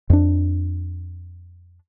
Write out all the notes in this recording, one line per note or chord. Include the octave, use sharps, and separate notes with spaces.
F2 D4